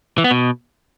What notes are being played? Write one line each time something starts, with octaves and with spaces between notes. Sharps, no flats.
E3
B3
B2